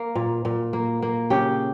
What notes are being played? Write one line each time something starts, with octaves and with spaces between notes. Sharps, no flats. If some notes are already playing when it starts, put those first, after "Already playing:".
Already playing: A#3
A#2
A#2
A#3
A#3
C#3 G4